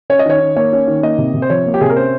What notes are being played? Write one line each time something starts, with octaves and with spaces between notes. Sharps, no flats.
C#4 C#5
D#5
D#3 C#5
D#3
A#3 C#5
C#4
D#3
A#3 D#5
C3
C3
C5
F3 C#5
A#3
G4
C3 G#4
A#4
C#4 C5